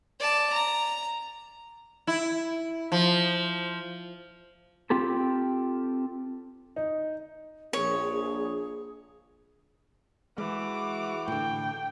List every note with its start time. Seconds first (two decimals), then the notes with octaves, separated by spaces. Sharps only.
0.20 D5 A5
0.53 A#5
2.07 E4
2.92 F3
4.90 C4 F4 G4 A4
6.76 D#4
7.73 A#1 G#4 C#5
10.38 E3 G#3 F#4 D6
11.28 A2 D3 G5